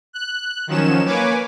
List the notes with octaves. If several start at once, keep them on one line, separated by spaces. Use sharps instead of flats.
F#6
D#3 F3 F#3 C#4 E7
A#3 B4 C#5 G#5 D6